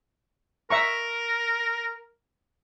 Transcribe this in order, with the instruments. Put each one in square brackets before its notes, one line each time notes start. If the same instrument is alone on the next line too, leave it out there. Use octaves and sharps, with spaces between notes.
[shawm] A#4 [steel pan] E5 A#5 C#6